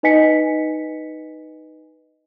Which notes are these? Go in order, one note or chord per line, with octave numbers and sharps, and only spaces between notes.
D#4 B4 D#5 G#5 B6 C#7